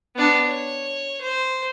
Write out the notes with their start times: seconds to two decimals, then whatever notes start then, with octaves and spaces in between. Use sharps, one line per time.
0.16 B3 D4
0.47 C#5
1.22 C5